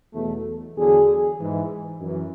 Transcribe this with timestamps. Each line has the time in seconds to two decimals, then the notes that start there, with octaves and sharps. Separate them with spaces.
0.14 E2 B2 F#3 A3
0.77 E2 D3 F#3 G#4
1.40 G#2 E3
2.01 F#2 E3